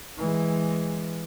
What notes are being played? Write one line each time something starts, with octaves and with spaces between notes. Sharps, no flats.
E3 G#3